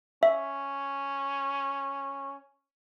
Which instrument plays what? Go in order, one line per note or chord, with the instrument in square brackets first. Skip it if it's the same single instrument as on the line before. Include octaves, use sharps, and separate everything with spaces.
[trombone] C#4 [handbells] E5